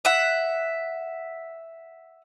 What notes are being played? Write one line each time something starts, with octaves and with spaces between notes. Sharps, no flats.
E5 F#5